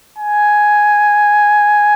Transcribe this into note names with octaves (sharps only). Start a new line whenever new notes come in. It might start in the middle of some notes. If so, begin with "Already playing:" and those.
G#5